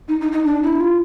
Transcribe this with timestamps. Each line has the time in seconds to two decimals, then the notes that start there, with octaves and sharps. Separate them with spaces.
0.08 D#4
0.21 D#4
0.32 D#4
0.44 D4
0.63 E4
0.81 F4